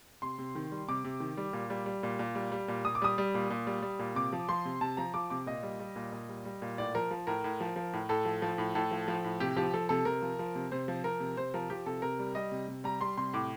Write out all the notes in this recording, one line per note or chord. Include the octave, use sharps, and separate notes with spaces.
C3 C6
C3
D#3
G3
C3 D6
C3
D#3
G3
A#2
G3
G3
A#2
A#2
G3
G3
A#2
A#2 D#6
D6
G3 D#6
G3
A#2
A#2
G3
G3
A#2
C3 D6
F3
F3 C6
C3
C3 A5
F3 A#5
F3 D6
C3 D6
A#2 D#5
G3
G3
A#2
A#2
G3
G3
A#2
A2 D5
F3 A#4
F3
A2 A#4
A2
F3
F3
A2
A2 A4
F3
F3
A2
A2 A4
F3
F3
A2
C3 G4
F3 G4
F3 A4
C3 A4
C3 A#4
F3
F3
C3
C3 C5
F3
F3 A#4
C3
C3 C5
F3 A#4
F3 G4
C3 A4
C3 A#4
G3
G3 D#5
C3
C3
G3 A#5
G3 C6
C3 C6
A2 D6